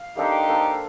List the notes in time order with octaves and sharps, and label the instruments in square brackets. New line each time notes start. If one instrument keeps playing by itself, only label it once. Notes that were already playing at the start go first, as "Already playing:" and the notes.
Already playing: [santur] F5
[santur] A#3 D4 A4 C5 [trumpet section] D#4 G4
[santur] A#3 D4 A4 C5